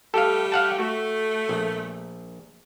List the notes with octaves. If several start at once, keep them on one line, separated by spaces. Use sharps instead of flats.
G3 A3 G4 A4 F5
F5 F#5 A5
A3 F#4
A#1